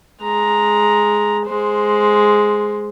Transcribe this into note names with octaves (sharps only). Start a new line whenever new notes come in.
G#3 A#5
G#3 C5